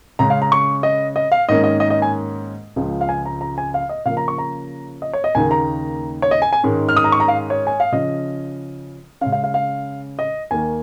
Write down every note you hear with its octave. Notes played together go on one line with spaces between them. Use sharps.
C#3 G#3 C#4 A#5
F5
A#5
C#6
D#5
D#5
F5
G#2 D#3 A#3 C#4 D#5
D#5
D#5
D#5
G#5
C#2 C#3 F3
F5
G#5
A#5
A#5
G#5
F5
D#5
C#3 F3 A#3 C#4 F5
A#5
C#6
A#5
D#5
C#5
D#5
D#2 C#3 A#3 D#4 G#5
A#5
C#5
D#5
G#5
G#5
G#2 D#3 G#3 C#4
F6
D#6
A#5
C#6
A#5
F5
C#5
G#5
F5
C#3 F3 C#4 D#5
C#3 G#3 C#4 F5
F5
F5
F5
D#5
D#2 D#3 A#3 G#5